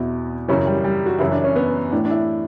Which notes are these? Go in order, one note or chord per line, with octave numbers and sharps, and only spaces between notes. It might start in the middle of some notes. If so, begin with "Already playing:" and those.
Already playing: E2 B2 E4
F#2 C#3 E3 C#4
G3
G3
F#4
F#2 C#3 E3 E4
D4
C#4
B3
A2 E3 D4
D4
E4